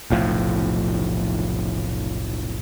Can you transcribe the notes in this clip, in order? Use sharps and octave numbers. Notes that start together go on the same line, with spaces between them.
F1 B1 A2 F3